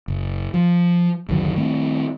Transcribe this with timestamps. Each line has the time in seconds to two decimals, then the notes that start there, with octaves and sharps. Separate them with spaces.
0.08 F#1
0.54 F3
1.29 F#1 D2 D#3 F#3
1.56 D#3 A3 C4